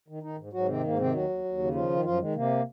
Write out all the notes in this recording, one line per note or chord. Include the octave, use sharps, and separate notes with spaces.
D#3
D#3 D#4
G#2
G#2 F#3 F#4
C3 D#3 C4
G#2 A#3
C3 D#3 C4
D#2 F#3 F#4
D#2
D#2
C#3
D#3 F3 F4
D#3
F#2 F3 F4
D#3 G#3
C3 A#3